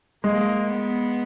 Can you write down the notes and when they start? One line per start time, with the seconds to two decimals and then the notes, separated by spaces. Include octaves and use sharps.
0.24 G#3 A#3
0.73 B3